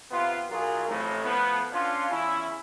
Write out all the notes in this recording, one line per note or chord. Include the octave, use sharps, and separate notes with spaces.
C3 B3 F4
B1 F#3 F4 G#4 A#4
A1 F2 A2
F3 A3 B3
C#4 D4 F4
E2 C#4 E4